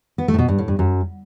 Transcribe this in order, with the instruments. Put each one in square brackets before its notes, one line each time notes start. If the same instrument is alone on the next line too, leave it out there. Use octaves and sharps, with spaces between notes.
[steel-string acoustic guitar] B3
A3
A2
B2
G2
A2
G2
F#2